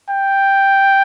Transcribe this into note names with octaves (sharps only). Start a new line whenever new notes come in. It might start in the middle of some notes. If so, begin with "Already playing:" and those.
G5